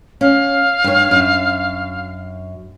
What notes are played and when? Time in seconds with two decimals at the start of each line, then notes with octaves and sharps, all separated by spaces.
0.21 C#4 F5
0.84 G2 C#5
1.11 F#2